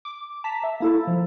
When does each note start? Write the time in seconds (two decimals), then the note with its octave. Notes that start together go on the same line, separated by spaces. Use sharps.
0.05 D6
0.44 A5 A#5 B6
0.63 E5
0.80 A#3 E4 A4
1.07 F3